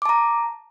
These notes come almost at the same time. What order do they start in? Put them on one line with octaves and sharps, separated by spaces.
D6 A5 A#5